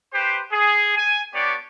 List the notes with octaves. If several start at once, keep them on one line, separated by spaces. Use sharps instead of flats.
G4 B4 C5
G#4
G#5
B3 D4 G4 C#5 D5